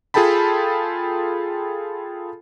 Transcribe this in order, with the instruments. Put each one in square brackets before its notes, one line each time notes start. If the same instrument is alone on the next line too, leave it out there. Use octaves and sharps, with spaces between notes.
[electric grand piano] F4 G#4 A4 G5 A5 B5